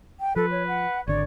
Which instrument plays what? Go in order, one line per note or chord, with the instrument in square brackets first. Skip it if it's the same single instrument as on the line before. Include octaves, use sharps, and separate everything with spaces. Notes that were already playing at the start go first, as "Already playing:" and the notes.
[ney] G5
[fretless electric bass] F3 [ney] A4 [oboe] B4
[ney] C#5
F#5
[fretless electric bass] G#1 D3 [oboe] C#5 [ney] D5